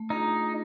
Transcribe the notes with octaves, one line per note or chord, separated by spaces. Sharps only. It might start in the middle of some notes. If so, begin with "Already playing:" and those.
Already playing: A3
D4 D#4 F4 G#4